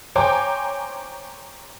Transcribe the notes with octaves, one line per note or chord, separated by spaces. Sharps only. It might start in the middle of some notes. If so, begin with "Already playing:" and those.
C5 C#5 G5 G#5 A#5 D6